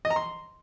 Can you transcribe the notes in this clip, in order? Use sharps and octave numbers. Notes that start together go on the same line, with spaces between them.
D#5
A#5
C6